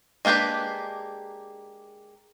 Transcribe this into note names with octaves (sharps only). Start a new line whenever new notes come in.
G#3 A#3 D4 G4 B4